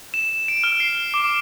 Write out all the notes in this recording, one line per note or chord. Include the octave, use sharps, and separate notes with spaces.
E7
D7
F6
C7
D6